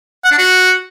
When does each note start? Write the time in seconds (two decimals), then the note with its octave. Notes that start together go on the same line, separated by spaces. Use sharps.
0.24 F#5
0.31 D4
0.38 F#4